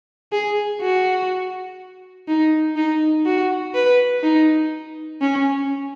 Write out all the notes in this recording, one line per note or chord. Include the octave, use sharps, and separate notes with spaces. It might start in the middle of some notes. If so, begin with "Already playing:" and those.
G#4
F#4
D#4
D#4
F#4
B4
D#4
C#4